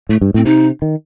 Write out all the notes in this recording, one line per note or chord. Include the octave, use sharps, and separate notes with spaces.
A2 A3
G2
A2 C4
C3 D#4
D#3